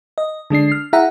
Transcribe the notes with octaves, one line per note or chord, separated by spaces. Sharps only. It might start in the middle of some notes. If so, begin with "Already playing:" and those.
D#5
D3 G#3 D4 C7
F6
E4 G#4 E5 F#5 G5 A#5